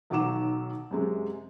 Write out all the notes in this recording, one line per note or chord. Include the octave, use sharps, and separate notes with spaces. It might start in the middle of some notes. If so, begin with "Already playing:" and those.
B1 D#3 F#3 D6 E7
F#2 C3 G#3